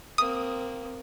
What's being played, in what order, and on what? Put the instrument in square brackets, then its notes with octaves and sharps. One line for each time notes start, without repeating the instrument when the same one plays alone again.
[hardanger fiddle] A#3 C4 [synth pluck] D#6